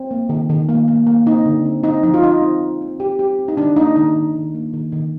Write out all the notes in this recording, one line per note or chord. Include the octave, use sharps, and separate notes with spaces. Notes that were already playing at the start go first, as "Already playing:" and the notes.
Already playing: C4
A#3
D#3
D#3
A#3
A#3
A#3
C4 D#4
D3
C4
C4 D#4
F3 D#4
F4
F3 D#4
C4
C4
C4
C4 G4
C4 G4
C4
D#4
D#3 D4
A#3 D#4
D#3 D#4
D#3
D#3
A#3
D#3
D#3